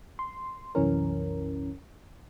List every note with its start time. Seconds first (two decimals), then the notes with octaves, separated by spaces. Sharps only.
0.19 C6
0.75 C2 F#2 E3 C#4 A#4